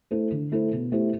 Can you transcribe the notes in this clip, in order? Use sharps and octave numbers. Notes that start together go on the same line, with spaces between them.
A3 E4 A4 C5
D3
A3 E4 A4 C5
B2
A3 E4 G4 C5